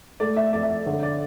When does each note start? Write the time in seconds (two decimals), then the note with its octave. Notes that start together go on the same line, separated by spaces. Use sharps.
0.20 A3 D5
0.37 E5
0.53 F2 D5
0.63 E5
0.69 D5
0.86 D3 C#5
1.03 D5